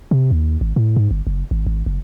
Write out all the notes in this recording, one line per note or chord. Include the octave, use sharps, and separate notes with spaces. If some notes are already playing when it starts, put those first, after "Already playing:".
C3
D#2
G#1
A2
G#2
G1
F#1
G#1
G#1
F#1